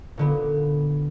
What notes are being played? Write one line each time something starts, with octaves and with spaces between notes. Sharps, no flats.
A#2 D3 B3